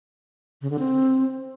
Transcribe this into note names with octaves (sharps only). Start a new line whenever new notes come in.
C#3
D3
C4